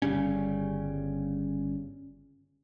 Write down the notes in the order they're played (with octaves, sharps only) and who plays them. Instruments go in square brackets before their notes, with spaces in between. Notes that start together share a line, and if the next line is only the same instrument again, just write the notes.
[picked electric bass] G1 C#3 G3 C#4